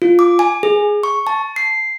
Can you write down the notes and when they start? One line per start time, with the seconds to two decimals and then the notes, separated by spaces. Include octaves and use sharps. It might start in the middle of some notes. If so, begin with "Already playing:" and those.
0.02 F4
0.19 D6
0.39 G#5
0.63 G#4
1.03 C#6
1.27 A5
1.56 C7